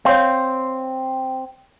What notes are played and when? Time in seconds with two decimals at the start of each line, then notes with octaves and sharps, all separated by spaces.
0.05 C4 C#5 F5